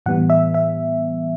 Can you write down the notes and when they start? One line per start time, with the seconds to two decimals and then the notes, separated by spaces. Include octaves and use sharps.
0.06 A2 E3 G3 B3 F#5
0.30 E5
0.54 E5